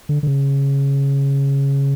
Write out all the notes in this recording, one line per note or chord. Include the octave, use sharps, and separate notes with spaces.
D3
D3
C#3